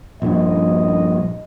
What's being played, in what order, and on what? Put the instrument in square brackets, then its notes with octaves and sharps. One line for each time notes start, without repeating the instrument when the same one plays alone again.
[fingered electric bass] A#1 G2 [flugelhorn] D#5